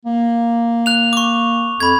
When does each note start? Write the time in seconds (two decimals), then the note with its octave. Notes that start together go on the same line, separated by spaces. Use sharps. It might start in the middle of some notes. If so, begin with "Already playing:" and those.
0.05 A#3
0.86 F#6 F7
1.13 C#6 D6
1.80 F2 B5 G#6